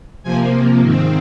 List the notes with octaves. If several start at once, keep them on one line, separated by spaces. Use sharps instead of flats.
C3 F3 A#3 G#5
G#2 D#3 C4